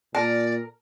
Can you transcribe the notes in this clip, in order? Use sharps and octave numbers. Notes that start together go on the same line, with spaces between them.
A#2 A#4 D5 A5